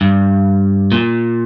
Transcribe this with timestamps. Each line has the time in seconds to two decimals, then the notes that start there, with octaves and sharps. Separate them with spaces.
0.01 G2
0.92 A#2